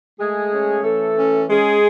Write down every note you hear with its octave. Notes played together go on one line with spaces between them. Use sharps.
G#3 A3 G#4
C#4
E3 A3 A4
C#4
G#3 C#4 G#4